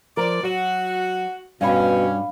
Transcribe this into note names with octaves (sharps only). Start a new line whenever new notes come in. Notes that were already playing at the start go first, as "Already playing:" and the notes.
F3 A#4 D5
F#3 F#4
G2 B2 C#4 F5 B5